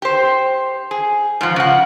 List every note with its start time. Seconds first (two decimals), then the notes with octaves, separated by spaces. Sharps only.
0.02 G4 C5
0.91 G#4
1.41 G#2 F3
1.56 C#3 F#5